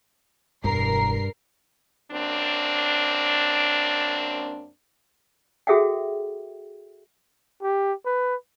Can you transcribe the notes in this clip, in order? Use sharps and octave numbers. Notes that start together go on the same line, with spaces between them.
E1 G2 A#4 A#5 C7
F#2 A#3 C4 D4
F#4 G#4 A4 E5 F#5 G5
G4
B4